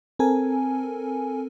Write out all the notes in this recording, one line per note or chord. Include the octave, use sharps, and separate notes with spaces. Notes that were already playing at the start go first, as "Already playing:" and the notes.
C4 A4 A#4 G#5